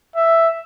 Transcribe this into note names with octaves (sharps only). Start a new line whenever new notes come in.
E5